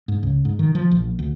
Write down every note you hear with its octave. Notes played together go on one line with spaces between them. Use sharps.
G#2
C#2
G#2
D#3
F3
A#1
D2